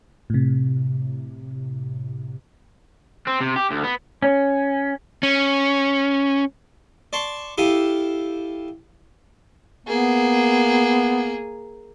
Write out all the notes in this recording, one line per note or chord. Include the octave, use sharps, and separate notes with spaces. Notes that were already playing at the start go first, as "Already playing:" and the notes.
A2 C3
C4
C3
G4
D2
B3
C#4
C#4
D5 A5 C6 C#6
E4 G4 A4 F5 D#6
A#3 B3 G#4